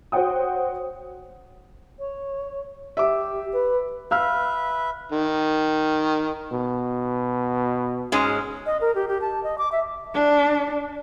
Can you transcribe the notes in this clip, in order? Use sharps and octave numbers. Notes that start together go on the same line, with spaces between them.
F#4 C5 C#5 F#5 G5 D#6
C#5
G4 E5 D6
B4
B4 E5 F5 E6 F6
D#3
B2
G#2 G#3 C#4
D#5
A#4
G4
G4
A5
D#5
D6
E5
D4